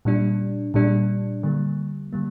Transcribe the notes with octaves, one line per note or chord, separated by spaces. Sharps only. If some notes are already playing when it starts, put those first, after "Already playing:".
A#2 G3 D4
A#2 G3 D4
D3 G3 A#3
D3 G3 A#3